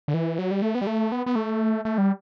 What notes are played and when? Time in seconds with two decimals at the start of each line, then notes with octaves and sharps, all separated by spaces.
0.08 D3
0.14 E3
0.39 F#3
0.51 G3
0.62 A3
0.75 B3
0.81 G3
0.87 A3
1.12 B3
1.26 B3
1.35 A3
1.85 A3
1.98 G3